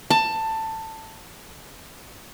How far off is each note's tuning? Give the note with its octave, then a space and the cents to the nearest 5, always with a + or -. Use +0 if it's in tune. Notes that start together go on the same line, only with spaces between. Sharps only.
A5 +15